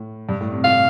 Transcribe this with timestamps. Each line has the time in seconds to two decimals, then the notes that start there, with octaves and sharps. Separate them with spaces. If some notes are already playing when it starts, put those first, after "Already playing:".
Already playing: A2
0.29 G2
0.41 A2
0.52 C3
0.64 A2 F5